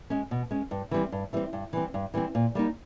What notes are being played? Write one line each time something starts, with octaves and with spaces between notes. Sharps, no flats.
G#3 C#4
B2
G#3 C#4
G2
E3 G3 C4
G2
E3 G3 C4
G2
E3 G3 C4
G2
E3 G3 C4
A#2
G3 A#3 D#4